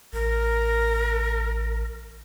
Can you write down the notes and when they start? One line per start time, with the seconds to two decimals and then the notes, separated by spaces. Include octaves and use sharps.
0.13 A1 A#4